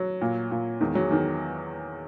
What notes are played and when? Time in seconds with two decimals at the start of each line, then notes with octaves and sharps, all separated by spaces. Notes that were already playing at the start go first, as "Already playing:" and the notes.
Already playing: F#3
0.21 A#2
0.51 A#2
0.81 E2 D#3 G#3
0.95 F#3
1.11 E2 D#3